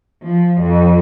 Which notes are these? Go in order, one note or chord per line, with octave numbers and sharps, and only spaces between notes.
F3
F2